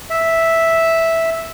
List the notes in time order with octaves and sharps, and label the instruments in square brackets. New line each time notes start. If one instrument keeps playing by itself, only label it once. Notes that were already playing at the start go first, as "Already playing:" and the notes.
[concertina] E5